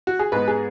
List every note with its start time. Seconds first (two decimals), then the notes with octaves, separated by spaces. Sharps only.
0.07 F#4
0.19 G#4
0.32 G#2 G#3 B3 B4
0.48 G#4